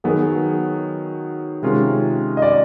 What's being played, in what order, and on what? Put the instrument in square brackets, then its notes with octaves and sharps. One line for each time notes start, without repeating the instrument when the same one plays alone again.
[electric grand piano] D#3 F#3 B3 [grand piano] G#4
[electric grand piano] C3 D#3 G#3 C#4 F4
[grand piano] D#5
D5